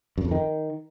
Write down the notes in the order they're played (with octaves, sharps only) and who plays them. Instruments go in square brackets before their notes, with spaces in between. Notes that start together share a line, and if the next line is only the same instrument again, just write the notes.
[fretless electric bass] F#2
F2
D#3